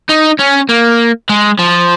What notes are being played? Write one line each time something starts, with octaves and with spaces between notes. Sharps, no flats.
D#4
C#4
A#3
G#3
F3